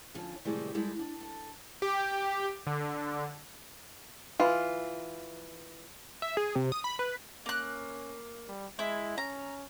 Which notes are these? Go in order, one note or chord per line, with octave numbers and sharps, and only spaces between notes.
D3 F3 C#4
A2 C3 D#3 E3 G3 G#3
G3 G#3 E4 G4 A4
D4
A4
G4
D3
E3 F4
E5
G#4
C3
D#6
B5
B4
A#3 C#4 F#6
G3
G#3 E4
C#4 A#5